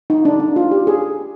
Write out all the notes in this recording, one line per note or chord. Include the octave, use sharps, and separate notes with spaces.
D#4
D4
D#4
F4
G4
G#4